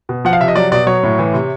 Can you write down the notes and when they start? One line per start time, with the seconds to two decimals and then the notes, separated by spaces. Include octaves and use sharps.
0.09 B2
0.25 F3 F#5
0.33 F5
0.41 C3 E5
0.48 D#5
0.56 F#3 D5
0.72 B2 D5
0.87 F#3 C#5
1.03 A2
1.19 E3
1.34 C3